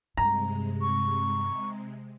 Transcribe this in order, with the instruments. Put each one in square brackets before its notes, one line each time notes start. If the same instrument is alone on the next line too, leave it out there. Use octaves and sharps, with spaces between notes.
[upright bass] G2 [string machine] C3 G#3 [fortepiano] A#5
[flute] C#6